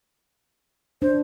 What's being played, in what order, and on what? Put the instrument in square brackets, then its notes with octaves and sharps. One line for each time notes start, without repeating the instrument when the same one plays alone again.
[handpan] D4 [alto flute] C5